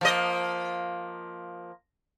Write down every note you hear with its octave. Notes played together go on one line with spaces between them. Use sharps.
F3 A#3 D#5